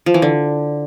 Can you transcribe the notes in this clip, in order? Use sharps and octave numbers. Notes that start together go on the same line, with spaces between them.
F3
E3
D3